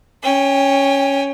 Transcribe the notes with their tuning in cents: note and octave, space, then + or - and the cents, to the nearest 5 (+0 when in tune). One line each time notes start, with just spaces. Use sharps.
C#4 +0 G5 +30